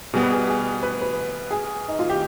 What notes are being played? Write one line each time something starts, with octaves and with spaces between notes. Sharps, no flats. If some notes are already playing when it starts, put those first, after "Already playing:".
B2 G3 B3 G#4
B4
G#4
G#4
B4
B4
G#4
D#4
F4
G4